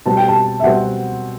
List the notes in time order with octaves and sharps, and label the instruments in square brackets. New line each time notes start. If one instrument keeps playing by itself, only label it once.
[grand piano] B2 G3 C4 [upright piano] A5
[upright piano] G5
A5
E5
[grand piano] B2 G3 C4 [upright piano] F#5